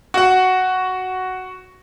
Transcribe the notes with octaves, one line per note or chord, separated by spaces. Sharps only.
F#4 F#5